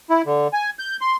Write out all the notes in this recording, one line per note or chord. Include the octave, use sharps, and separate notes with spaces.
E4
D3
G#5
G6
C6